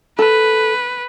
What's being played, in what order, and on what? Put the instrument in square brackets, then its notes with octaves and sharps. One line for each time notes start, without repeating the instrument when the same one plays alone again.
[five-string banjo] A4 [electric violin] B4